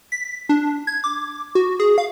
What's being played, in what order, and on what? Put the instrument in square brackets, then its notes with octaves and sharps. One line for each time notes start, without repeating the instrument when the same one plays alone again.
[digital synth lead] B6
D4
G#6
D6
F#4
G#4
F5